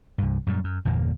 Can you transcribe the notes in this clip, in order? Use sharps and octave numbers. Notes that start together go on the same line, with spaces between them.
C2 G2
F#2 A#2 G3
F#2
G1 E2 A#2 A#3